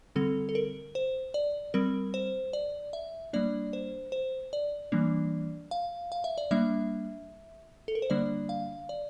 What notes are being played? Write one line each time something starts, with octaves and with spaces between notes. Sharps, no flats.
D3 G3 C4 A4
A4
A#4
C5
D5
G3 C4 A#4
C5
D5
E5
G3 A#3 D4 D5
C5
C5
D5
E3 G3 A#3 D4
F5
F5
E5
D5
G3 A#3 D4 E5
A4
A#4
C5
D3 G3 A#3 D4 D5
F5
D5